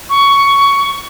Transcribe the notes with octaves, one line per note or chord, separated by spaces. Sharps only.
C#6